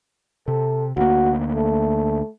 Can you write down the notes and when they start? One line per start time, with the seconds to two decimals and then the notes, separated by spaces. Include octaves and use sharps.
0.48 C3 A4
0.97 D2 A#3 F#4
1.53 A3